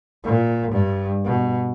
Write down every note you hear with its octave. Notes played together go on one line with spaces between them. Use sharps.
A#2
G2
B2